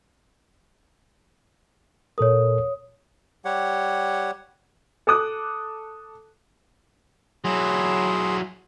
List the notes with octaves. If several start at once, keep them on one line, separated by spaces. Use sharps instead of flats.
A#2 A4 A#4 C#5 D#6
G3 G4 C#5 F#5
A4 D6 D#6 F#6
F#3 E4 G#4 C6